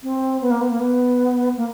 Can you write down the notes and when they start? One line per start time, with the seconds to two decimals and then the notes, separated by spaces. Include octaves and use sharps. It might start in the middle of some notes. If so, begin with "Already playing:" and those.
0.03 C4
0.41 B3
0.51 A#3
0.61 B3
0.70 A#3
0.80 B3
1.57 A#3